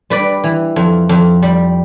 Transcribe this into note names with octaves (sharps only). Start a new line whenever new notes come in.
G3 B4 D5
E3
F2
F2
G3